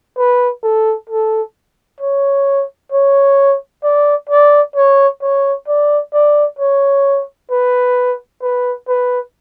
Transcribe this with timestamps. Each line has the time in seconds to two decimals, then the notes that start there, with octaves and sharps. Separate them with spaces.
0.17 B4
0.63 A4
1.09 A4
2.01 C#5
2.92 C#5
3.83 D5
4.29 D5
4.76 C#5
5.22 C#5
5.68 D5
6.13 D5
6.59 C#5
7.51 B4
8.42 B4
8.88 B4